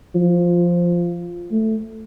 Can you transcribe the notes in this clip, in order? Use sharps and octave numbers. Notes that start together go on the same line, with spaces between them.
F3
A3